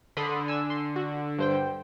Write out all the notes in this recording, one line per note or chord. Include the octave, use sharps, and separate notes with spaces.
D3 B5 C6 D#6
G#5 E6
C6
F#4
G2 C5 G5